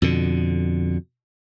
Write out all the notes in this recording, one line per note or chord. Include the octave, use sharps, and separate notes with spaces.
F2 B2 D3